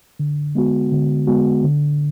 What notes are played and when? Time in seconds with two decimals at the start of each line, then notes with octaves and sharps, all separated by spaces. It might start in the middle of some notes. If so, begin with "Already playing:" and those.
0.19 D3
0.55 G#3 B3 F#4
0.92 D3
1.27 G#3 B3 F#4
1.64 D3